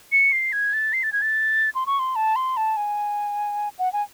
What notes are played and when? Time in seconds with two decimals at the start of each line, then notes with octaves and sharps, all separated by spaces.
0.12 C#7
0.33 C7
0.53 G#6
0.73 A6
0.93 C7
1.03 A6
1.13 G#6
1.22 A6
1.75 C6
1.87 C#6
1.99 C6
2.16 A5
2.36 C6
2.57 A5
2.77 G#5
3.79 F#5
3.93 G#5